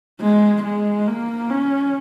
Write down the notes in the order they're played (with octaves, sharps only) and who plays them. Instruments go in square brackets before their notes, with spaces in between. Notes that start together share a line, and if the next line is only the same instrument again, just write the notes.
[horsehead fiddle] G#3
G#3
A#3
C#4